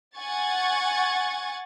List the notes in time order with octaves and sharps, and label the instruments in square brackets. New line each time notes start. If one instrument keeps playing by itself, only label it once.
[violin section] F#5 G#5 C#6 G#6 A6